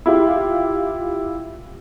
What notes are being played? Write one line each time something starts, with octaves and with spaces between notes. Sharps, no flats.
E4 F4 G4